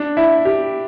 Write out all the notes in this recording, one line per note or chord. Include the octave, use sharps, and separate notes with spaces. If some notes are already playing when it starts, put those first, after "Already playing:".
Already playing: D4
E4
G4